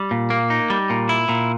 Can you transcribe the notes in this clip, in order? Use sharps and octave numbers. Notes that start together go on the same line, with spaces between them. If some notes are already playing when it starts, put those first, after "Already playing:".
Already playing: G3
A#2
A#3
D#4
G3
A#2
E4
A#2